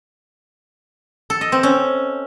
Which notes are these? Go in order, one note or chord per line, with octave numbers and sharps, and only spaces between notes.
A4
D#5
C4
C#4